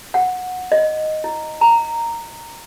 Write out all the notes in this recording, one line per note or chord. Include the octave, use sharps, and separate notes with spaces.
F#5
D#5
E4
A#5